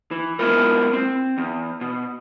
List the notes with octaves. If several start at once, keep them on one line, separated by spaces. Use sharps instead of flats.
E3
G#3 B3 E4 F4 A#4
C4
E2
B2